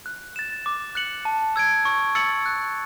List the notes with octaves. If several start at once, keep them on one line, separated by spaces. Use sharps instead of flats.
F#6
A6 E7
D6
F#6 C#7 F#7
A5
E6 G#6 D7
C#6
E6 A6 C#7 F#7
F#6